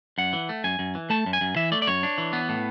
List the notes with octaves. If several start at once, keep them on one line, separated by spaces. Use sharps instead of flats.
F#2 F#5
E3
A3
F#2 G#5
F#2
E3
A3 A5
F#2
G#5
F#2
E3 E5
A3 D5
D5
F#2 C#5
D4
E3
B3
A2